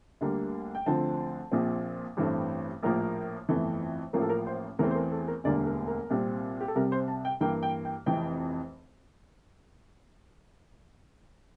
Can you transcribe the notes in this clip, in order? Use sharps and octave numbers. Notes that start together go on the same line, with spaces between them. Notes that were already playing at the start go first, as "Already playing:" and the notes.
D2 D3 G3 A#3
G5
D2 D3 F3 C4 A5
A#1 A#2 F3 C4
A1 G2 E3 A3 C4
A#1 A2 F3 A#3 A#4
G1 F2 E3 A3
A1 A2 F3 A#3 A#4
A4
A#4
C5
E2 E3 A3 C4 A#4
C5
A#4
A4
A#4
E1 D2 D3 G3 A#3 D5
A#4
A#4
C2 A#2 G3 C4
G4
A4
C2 C3 G3 A#4
C5
A5
G5
G2 E3 A#3 G5
G5
G5
F1 F2 E3 G5